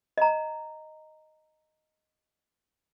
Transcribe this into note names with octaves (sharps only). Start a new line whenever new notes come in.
D#5 A#5